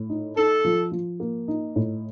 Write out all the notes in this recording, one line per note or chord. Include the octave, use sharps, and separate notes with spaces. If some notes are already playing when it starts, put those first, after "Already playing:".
Already playing: A2
D#4
D#4 A4
F3
F3
A#3
D#4
A2